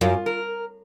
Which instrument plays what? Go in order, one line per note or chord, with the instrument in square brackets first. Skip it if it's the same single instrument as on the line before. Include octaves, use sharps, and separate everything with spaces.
[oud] F#2 [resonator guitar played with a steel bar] F4
[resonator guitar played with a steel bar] A#4